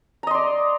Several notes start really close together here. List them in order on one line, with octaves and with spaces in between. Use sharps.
A#5 D#5 C6 D5